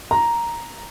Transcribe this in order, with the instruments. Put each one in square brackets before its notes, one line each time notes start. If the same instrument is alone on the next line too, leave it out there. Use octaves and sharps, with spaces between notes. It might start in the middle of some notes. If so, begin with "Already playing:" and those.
[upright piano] A#5